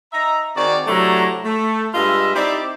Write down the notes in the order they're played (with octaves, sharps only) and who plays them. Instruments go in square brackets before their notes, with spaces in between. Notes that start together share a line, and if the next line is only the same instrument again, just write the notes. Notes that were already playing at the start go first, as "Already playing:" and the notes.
[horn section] D#4 D#5 E5 A#5
D#3 C4 F#4 G#4 D5
C3 F#3 A3 D4 E4 A#5
A3
G2 G#3 F4 D#5 E5
C4 D#4 E4 G4 D5